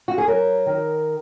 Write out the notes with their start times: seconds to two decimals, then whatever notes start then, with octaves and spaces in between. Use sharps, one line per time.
0.08 F#4
0.18 G#4
0.27 F#3 A#4
0.66 D#3